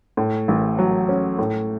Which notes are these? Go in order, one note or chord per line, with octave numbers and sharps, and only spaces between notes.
A2
A1
F#3
C#4
A2